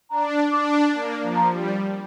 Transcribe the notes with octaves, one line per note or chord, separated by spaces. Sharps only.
D4 A#5
D4 D6
A#3
F3
A#5
G3